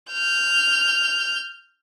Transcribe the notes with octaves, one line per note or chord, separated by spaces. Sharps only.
F6 G6